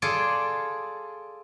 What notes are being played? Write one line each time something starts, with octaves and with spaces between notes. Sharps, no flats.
F4 G#4 A4 D5